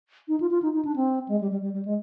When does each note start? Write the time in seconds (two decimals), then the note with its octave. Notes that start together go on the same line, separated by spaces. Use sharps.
0.28 D#4
0.40 F4
0.51 F4
0.62 D#4
0.73 D#4
0.85 D4
0.96 C4
1.28 G#3
1.41 G3
1.51 G3
1.62 G3
1.73 G3
1.85 G#3